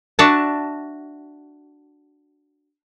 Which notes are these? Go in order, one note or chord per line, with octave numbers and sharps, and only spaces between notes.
D4 F#4 E5 A5